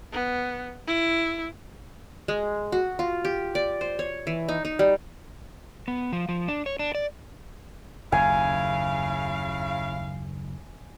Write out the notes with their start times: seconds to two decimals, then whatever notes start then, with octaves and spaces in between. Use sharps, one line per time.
0.13 B3
0.87 E4
2.28 G#3
2.72 F#4
2.99 F4
3.25 G4
3.55 D5
3.81 C5
3.99 C#5
4.27 E3
4.48 D#4
4.65 D#4
4.79 G3
5.88 B3
6.13 F3
6.29 F3
6.48 D4
6.66 C#5
6.79 D4
6.95 D5
8.12 F#1 D#2 C#3 E4 F5 G#5